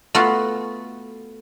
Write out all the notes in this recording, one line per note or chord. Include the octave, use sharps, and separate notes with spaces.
A3 B3 F4 F#4